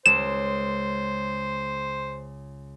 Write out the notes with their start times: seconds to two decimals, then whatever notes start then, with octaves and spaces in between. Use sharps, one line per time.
0.06 C#2 C5 E7